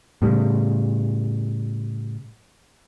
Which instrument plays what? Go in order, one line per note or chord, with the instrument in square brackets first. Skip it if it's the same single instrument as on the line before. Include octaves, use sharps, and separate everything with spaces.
[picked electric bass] A2 C#3 G3